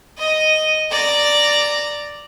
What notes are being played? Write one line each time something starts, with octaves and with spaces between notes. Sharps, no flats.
D#5 D#6
D5 A#5